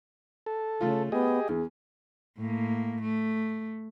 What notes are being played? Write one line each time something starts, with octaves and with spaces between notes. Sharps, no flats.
A4
C#3 A3 F4
B3 G4 G#4 D#5
E2 G#4
A2 A#3
A3